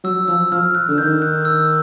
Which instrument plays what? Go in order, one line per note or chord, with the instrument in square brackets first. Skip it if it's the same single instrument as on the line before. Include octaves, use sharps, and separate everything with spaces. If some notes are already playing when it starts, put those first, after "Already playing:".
[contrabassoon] F#3 [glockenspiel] E6
[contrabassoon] F3 [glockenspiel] E6
[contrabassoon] F3 [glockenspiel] F6
[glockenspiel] F#6
[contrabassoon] D3
[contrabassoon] D#3 [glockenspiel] G6
[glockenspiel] F#6
E6